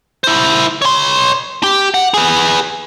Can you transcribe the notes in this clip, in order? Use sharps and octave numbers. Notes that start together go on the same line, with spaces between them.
E4 C5
C#5 C6
G4
F#5
G#4 B4